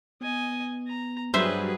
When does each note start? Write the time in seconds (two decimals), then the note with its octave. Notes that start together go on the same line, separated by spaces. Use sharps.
0.21 B3 D#5 G#5
0.87 A#5
1.34 G2 F#3 G3 G#4 B4 C5 E5